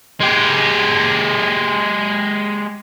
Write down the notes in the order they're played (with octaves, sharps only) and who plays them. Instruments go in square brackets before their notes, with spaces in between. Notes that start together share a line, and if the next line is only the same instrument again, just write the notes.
[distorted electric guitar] G#3 G4